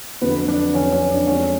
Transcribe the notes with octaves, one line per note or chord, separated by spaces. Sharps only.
F2 D3 F#3 B3 B4
D4 D5
F2 D3 F#3 C#4 C#5
C#4 C#5
D4 D5
F2 F3 G#3 C#4 C#5